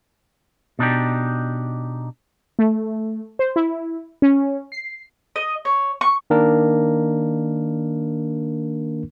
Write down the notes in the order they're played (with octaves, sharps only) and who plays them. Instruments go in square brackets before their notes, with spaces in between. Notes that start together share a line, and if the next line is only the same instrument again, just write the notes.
[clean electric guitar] B2 D4 D#4 G4
[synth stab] A3
C5
E4
C#4
C7
[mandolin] D#5
C#5
C#6
[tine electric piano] D#3 A#3 D4 A#4